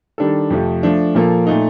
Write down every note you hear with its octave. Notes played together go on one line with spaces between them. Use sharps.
D#3 G3 D4 A4
F2 C3 F3 A3
F3 A3 D4
A#2 F3 A#3 F4 A4
A#2 A3 D#4